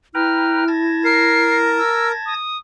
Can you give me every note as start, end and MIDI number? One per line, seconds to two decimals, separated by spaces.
0.14 1.81 64
0.14 0.64 71
0.14 0.64 79
0.14 0.64 82
0.14 0.69 89
0.68 2.34 81
0.68 2.34 92
0.68 2.34 94
1.05 2.12 70
1.05 1.56 96
1.78 2.08 88
2.26 2.58 87